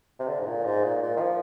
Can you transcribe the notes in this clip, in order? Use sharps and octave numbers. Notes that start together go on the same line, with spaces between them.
C3
D3
G#2
A#2
G#2
A#2
A#2
D#3
F3